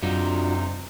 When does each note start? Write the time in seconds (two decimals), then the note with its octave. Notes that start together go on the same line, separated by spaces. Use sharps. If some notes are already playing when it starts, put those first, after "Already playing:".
0.02 F#2 C3 D4 D#4 F4 F#4